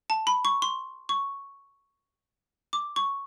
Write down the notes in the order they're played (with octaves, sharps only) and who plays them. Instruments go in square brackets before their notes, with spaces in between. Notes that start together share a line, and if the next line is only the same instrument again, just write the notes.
[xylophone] A5
B5
C#6
C6
C#6
D6
C#6